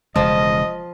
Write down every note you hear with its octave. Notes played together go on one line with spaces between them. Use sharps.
E1 C#3 F3 G#3 D#5